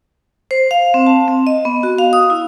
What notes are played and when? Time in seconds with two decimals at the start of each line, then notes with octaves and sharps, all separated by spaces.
0.51 C5
0.71 F5
0.94 C4
1.06 A5
1.28 C4
1.47 D#5
1.65 B3
1.83 F#4
1.98 F5
2.13 D#6
2.30 E4